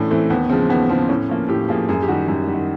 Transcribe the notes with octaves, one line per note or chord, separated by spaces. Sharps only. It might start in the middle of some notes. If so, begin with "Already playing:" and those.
Already playing: A2 E3 A3 C#4 D4
E3 A3 C4
D#2 B3
C#3 F3 G#3 C4
D#2 B3
C#3 F3 G#3 C4
A2 C#4
F3 A#3
A2 G4
F3 A#3 G#4
F#2 G#4
G4
D#3 G3 F#4
F#2
D#3 G3